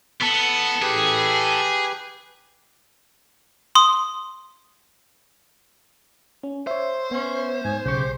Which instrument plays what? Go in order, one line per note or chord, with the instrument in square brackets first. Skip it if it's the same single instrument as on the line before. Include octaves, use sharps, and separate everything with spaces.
[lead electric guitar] E3 A4 [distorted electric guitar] B3
[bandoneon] G4 B4 [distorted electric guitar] G#4
[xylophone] C6 D#6
[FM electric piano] C#4
[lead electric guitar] C5 [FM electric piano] C#5 E5
[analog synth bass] B3 [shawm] C#4
[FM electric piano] G#2 [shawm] G#5
[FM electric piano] B1 C#6 [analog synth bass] C#3 [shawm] G4